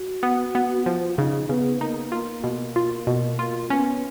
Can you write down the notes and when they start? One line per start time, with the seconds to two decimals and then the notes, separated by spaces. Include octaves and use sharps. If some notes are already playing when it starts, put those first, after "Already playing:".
Already playing: F#4
0.23 B3
0.55 B3
0.86 F3 F4
1.18 C#3 D#4
1.49 C#3 B3
1.81 A#3 D#4
2.12 A#3 F4
2.44 B2
2.76 F4
3.07 B2
3.39 A#3 F4
3.70 B3 C#4